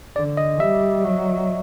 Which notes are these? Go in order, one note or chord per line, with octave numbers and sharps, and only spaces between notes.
D3 D5
D#5
G3 E5
F#3